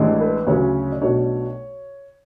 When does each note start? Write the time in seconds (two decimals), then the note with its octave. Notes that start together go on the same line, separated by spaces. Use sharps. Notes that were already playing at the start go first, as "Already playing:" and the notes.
Already playing: A1 A2 E3 G#3 D4
0.21 B4
0.47 D2 C#3 F#3 C#4 C#5
0.92 D5
1.01 B1 B2 A3 D4 C#5